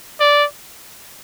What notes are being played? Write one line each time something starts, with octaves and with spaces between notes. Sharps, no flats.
D5